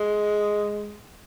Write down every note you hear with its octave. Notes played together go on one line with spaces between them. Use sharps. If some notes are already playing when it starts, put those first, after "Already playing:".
Already playing: G#3